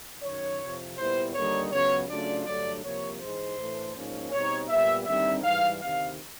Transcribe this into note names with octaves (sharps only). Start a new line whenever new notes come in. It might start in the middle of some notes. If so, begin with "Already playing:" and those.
F#2 D#3 F#3 C#5
F2 C3 F3
A#2 G3 B3 E4 C5
D#2 D3 G3 A#3 D#4 C#5
C#2 C#3 F#3 B3 C#5
C#3 F#3 A3 D4 F4 D5
G2 D3 F#3 A3 D5
C2 C3 F3 A#3 C#5
G#2 E3 G#3 C5
A2 E3 A3 D4
G#2 F3 A#3 C#4
B2 G3 C4 D#4 C#5
A#2 G3 B3 E5
D#2 D3 G3 C4 D#4 E5
G#2 E3 G3 F5
D2 C3 D#3 F5